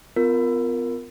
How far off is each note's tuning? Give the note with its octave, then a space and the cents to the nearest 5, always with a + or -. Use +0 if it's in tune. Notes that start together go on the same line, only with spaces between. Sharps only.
B3 +45 F4 +0 A#4 +0